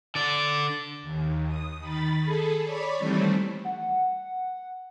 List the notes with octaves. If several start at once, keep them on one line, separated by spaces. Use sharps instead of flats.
D3 D5
D#2
D#6
D#3 B5 A6
G#4 A4
C#5 D5 B5
D#3 E3 G3 A3 C4
F#5